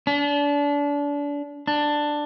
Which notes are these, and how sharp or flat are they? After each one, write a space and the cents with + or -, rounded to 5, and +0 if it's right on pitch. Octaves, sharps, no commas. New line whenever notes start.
D4 -30
D4 +10